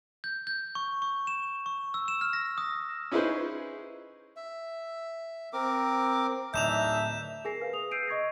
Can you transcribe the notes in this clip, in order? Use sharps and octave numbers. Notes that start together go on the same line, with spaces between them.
G6
G6
C#6
C#6
E7
C#6
E6
E7
F6
A#6
D#6
C#4 D#4 E4 G#4 B4 C5
E5
C4 A#4 D6
D1 E3 D4 D#4 E5 G6 E7 F7
G#4 A#4 G#5 A#6 C7
B4 F5
D#6 F7
E6 G6 C7 D7 D#7
D#5 C#6 G#6 A#6